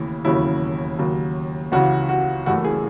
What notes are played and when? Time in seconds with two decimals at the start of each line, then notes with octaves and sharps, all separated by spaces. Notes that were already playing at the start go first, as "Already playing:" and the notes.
Already playing: D#2 C#3 E3 A3 E4
0.25 E1 D#2 C#3 F#3 C#4 E4
0.98 D#2 C#3 F#3
1.72 C#2 C#3 E3 F#4
2.09 F#4
2.46 F#1 F#2 E3 A3 E4 F#4
2.64 G#4